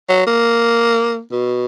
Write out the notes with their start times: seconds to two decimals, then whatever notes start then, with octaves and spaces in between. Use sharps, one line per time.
0.09 F#3
0.26 A#3
1.32 B2